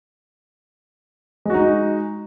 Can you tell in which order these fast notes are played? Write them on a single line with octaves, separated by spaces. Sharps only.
G#3 F#4 D#4